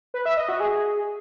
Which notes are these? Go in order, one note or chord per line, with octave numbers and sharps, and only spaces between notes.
B4
E5
D#5
F#4
G#4